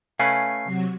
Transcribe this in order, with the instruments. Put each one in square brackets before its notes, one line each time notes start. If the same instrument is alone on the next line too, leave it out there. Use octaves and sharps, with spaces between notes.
[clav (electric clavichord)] A3 C#4 B4 [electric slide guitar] F5 G#5 [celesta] C7
[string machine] C3 F#3 F#4